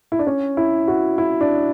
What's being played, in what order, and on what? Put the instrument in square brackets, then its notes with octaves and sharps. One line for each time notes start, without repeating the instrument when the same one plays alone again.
[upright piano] E4
D4
C#4
E4
F#4
E4
D4